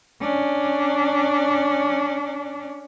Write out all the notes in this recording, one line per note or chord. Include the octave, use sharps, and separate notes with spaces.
C#4 D4